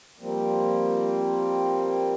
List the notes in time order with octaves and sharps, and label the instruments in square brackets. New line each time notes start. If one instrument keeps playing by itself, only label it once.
[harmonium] F3 G3 A#3 C4